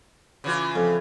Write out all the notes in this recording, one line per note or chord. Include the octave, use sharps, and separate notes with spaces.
C#3 E3 F4
F2